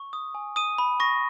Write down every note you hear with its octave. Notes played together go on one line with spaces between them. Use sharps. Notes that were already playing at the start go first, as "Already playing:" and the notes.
Already playing: C#6
D#6
G#5
D#6 D#7
B5
C#6 A#6